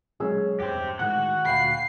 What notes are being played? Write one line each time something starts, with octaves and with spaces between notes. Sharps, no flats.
B2 F#3 G#3 C#4 G#4 E6
E2 G2 G4 C5
A2 D#3 G#3 F#4 F#5 F#6
D2 A#2 F5 G5 B5 C7